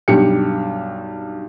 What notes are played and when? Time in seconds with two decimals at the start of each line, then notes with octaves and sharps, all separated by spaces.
0.08 B1 G2 G4 C#7